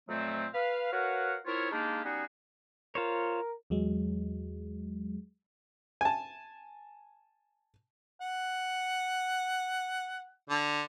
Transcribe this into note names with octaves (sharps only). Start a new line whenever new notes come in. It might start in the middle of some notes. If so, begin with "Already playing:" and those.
F2 A#2 F#3 A3 C4
B4 F5
F#4 A#4 B4 C#5 F5 F#5
C4 E4 F4 A#4 C#5
G#3 A#3 D4 D#4 F4 G4
G3 B3 C#4 D#4 F#4 G#4
F4 A#4 C5 C#5
E2 F#3 G#3
G#5 A5
F#5
D3